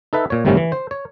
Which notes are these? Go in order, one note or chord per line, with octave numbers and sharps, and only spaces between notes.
D#4 A4 B4 E5
A#2 C#5
G1 A2 C3 D#3 G3 C#4
E3
C5
C#5